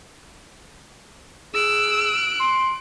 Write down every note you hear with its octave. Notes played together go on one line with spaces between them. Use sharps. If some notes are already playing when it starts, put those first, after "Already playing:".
G#4 E6 F#6 D7
C6